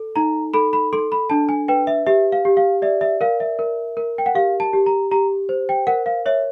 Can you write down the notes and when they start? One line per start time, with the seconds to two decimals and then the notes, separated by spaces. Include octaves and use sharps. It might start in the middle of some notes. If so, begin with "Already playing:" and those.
Already playing: A4
0.16 D#4 A#5
0.54 A4 B5
0.73 B5
0.93 A4 C6
1.12 B5
1.30 D4 A5
1.49 G#5
1.68 B4 G5
1.87 E5
2.06 G4 E5
2.32 F5
2.45 G4
2.57 F5
2.82 D5 E5
3.01 E5
3.21 A#4 F5
3.40 E5
3.59 A#4
3.97 A#4
4.18 G5
4.26 F#5
4.35 G4 F5
4.60 A5
4.73 G4
4.86 A#5
5.11 G4 A#5
5.49 C5
5.69 G5
5.87 A#4 F#5
6.06 F5
6.26 C#5 E5